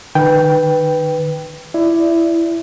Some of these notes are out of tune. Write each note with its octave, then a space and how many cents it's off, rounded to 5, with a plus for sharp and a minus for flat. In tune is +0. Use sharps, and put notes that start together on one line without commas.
D#3 -35 B4 +0 G5 +0
E4 +15 D5 +0